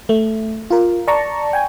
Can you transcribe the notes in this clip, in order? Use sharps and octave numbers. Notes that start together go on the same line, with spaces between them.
A3
F4 A#4
D5 A5 A#5 C#6
G5 G#5